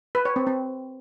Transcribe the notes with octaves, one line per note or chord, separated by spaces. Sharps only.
B4
C#5
C4
C4